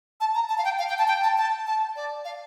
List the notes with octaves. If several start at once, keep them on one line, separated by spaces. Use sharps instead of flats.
A5
A#5
A5
F5
G5
F5
G5
A5
G5
A5
A5
A5
D5
F5